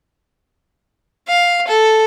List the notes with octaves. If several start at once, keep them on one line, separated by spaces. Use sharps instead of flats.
F5
A4